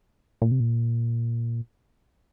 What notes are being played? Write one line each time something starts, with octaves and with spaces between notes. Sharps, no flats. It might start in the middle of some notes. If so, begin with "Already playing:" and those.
A#2
C3
A#2